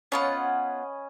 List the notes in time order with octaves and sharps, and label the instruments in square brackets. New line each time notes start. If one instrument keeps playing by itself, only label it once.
[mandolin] B3 F4 F#5 [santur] C#4 D#5 B5